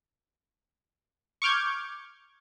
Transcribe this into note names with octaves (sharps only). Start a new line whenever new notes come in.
C#6 D6 F6 G6 G#6